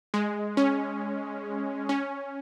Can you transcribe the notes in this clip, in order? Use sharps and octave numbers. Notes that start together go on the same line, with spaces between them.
G#3
C#4
C#4